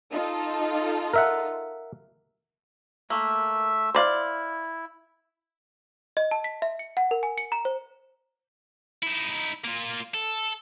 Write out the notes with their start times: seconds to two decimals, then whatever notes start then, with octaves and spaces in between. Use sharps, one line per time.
0.12 D#4 F4 A4
1.14 A#4 E5 F#5
3.10 A3 A#3 E5
3.95 E4 C5 D5 F5
6.17 D#5
6.31 A5
6.44 B6
6.62 E5
6.79 C#7
6.97 F#5
7.11 A#4
7.23 G#5
7.38 C#7
7.52 A#5
7.65 C5
9.03 D#4 E4
9.64 A#3 F4
10.14 A4